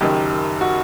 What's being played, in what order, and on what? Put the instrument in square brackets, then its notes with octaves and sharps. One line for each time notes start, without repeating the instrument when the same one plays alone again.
[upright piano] F#1 F#2 D#3 G4
F#4